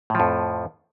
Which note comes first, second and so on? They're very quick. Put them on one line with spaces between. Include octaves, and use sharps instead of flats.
A2 F3 F2